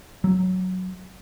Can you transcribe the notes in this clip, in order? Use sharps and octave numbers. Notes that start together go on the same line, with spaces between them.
F#3